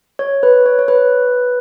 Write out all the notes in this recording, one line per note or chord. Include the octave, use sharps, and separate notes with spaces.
C#5
B4
C#5
C#5
B4